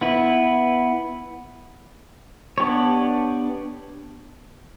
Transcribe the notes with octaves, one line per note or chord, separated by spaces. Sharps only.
B3 E4 B4
B3 D4 G4 C#5